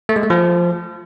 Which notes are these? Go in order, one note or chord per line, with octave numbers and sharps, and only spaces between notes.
A3
G#3
A3
F3